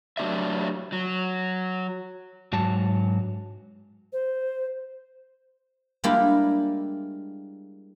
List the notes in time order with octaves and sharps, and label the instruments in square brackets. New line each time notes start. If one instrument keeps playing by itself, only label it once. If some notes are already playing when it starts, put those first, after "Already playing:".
[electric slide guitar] F#3 A3 D4 G4 D#5 E5
F#3
G#2 F#3 A5
[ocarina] C5
[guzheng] G3 G#3 A#3 D4 E4 F4